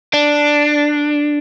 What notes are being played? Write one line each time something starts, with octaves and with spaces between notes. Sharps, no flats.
D4